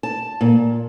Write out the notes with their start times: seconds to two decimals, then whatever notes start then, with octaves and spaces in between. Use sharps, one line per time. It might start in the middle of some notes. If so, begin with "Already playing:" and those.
0.03 A5
0.41 A#2